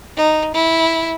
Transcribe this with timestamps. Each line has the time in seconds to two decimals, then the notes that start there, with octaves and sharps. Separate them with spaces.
0.17 D#4
0.54 E4